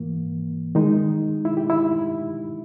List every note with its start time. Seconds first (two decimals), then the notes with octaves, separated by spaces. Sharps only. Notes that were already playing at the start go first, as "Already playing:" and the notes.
Already playing: G#2 E3 A#3
0.75 D#3 G#3 D#4
1.45 E4
1.57 G4
1.70 E4